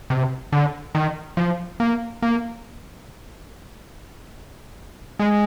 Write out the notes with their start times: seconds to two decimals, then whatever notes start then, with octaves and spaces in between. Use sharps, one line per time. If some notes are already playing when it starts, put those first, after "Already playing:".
0.10 C3
0.52 D3
0.95 D#3
1.37 F3
1.80 A#3
2.22 A#3
5.19 G#3